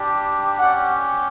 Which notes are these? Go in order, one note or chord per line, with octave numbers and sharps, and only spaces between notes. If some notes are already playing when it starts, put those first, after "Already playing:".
Already playing: G3 D4 G4
C#4 G4 D5 F#5